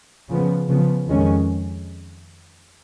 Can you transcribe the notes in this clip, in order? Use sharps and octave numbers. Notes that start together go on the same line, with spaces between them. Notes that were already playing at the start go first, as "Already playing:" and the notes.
C#3 F3 B3
C#3 F3 B3
F2 D#3 G#3 C#4